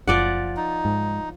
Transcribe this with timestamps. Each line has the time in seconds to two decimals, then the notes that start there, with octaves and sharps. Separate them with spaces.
0.08 F#1 F3 D5 F#5
0.57 D#4
0.85 G#2